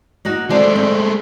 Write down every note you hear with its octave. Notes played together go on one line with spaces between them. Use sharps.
A#3 D#4 F#4
G#3 A3 C4 D5 A5
C4